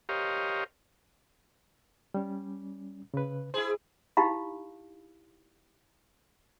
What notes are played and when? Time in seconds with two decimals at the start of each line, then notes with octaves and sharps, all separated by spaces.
0.09 G4 A#4 C5 C#5 D#5 F5
2.14 G3 C#4
3.14 C#3 B4
3.54 E4 G#4 C5
4.17 D#4 E4 G4 F5 B5